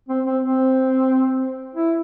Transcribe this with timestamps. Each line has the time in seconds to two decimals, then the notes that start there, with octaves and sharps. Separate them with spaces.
0.09 C4
0.25 C4
0.42 C4
1.75 E4